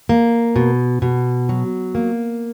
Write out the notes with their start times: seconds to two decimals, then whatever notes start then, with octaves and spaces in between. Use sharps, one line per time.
0.09 A#3
0.56 B2
1.02 B2
1.49 F#3
1.95 A#3